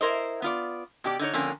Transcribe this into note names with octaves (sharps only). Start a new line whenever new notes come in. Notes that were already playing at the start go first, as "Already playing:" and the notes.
E4 A#4 C5 D#5
B3 F4 D5
B2 G4 D5
D3 D#4 C#5
F2 D3 A#3 C#4